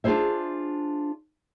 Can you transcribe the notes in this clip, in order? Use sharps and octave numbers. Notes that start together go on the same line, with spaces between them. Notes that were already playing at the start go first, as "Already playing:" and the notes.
D4 F4 F#4 G#4 C5 E5